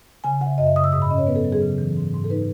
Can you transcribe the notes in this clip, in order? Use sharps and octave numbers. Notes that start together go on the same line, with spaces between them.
C#3 G#5
C#3 F#5
E5
F#2 D#5
E5
C#3 D#6
E6
G#2 D#6
B5
C#4 D#5
C#5
B3 B4
A4
F#3
G#4
C#3
E3
G#2
G#2
A4
D#4 B4